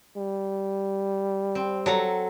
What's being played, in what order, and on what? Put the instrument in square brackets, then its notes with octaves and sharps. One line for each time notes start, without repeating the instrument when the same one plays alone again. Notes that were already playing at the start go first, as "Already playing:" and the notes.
[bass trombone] G3
[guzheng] C4
F#3 A4 A#5